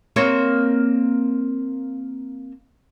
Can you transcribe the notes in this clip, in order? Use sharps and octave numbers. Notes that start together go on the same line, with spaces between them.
A#3 C4 C#5